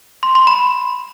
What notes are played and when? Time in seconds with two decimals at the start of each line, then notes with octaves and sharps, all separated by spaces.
0.23 C6
0.35 C6
0.47 B5